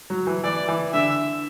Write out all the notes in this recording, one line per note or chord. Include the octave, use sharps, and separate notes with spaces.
F#3
E3
E3 D5
E3
D3 E5